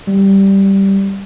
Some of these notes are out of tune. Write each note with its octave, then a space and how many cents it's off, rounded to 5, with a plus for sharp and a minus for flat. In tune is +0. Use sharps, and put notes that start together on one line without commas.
G3 -5